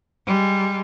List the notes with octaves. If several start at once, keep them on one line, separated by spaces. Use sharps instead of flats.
G3 G#3